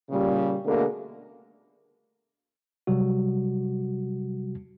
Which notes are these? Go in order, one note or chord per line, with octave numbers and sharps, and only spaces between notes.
A#2 C#3 G3
B2 D3 A3 A#3 G#4 A#4
C3 F#3 G3 F#4